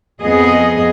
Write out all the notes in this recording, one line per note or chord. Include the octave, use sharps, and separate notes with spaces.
F2 B3 G#4 D#5